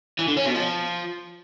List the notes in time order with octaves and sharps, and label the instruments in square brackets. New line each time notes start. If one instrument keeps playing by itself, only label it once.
[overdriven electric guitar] E3
D3
C#4
B2
F3